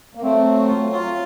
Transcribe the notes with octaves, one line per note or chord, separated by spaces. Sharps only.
A#3
F#3 A3 C4
F#3
F4
F4